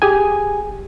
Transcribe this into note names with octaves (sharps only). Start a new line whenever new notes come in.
G4 G#4 G#5